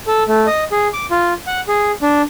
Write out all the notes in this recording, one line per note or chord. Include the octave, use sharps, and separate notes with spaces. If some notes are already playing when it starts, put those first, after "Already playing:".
A4
A3
D#5
G#4
D6
F4
F#5
G#4
D4